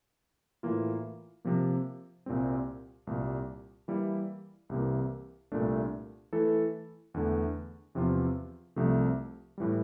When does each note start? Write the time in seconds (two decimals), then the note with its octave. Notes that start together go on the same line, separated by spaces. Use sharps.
0.63 A2 E3 A#3 F4
1.45 C3 F3 A#3
2.26 C2 A#2 G3 C4
3.07 C2 A#2 G3 A#3
3.88 E3 G3 A#3 E4
4.69 C2 C3 E3 A#3
5.52 C2 A#2 A3 D4
6.33 E3 A3 E4 A4
7.14 E2 D3 A3
7.95 E2 C3 F3 C4 F4
8.76 C2 C3 F3 A3
9.58 A2 E3 G3